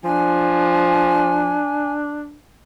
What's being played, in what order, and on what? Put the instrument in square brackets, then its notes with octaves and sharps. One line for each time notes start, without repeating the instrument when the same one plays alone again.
[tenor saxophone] F3 [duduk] D4 [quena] G#5